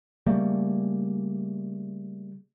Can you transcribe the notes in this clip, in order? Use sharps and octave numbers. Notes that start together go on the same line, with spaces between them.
C#3 G3 A3 A#3